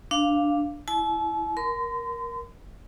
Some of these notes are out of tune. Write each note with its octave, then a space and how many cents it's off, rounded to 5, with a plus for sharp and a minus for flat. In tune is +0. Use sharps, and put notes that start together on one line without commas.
D4 +0 F5 -5
E4 +0 A5 -45
A#4 +10 C6 -40